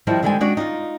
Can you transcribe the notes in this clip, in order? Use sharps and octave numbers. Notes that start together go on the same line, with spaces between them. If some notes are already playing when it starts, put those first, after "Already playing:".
D#3 F3 G3 D#4 E4
D3 D#3 G3 G#3 C4 G#5
G#3 D4 F#4
D#4 F4